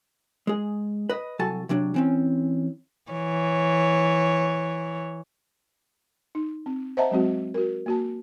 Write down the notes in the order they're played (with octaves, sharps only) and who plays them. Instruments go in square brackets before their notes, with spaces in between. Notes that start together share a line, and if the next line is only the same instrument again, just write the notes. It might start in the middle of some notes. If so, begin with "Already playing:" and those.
[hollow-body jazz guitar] G#3 G#4
B4 D#5
C2 F#3 F#4 A4 G#5 A5
C3 F#3 D4
E3 C4 C#4
[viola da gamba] E3 C#5
[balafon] D#4
C4
C5 D#5 E5 F#5 A5 A#5
F#3 G#3 C4 F#4
F#4 A#4
A#3 F#4 A5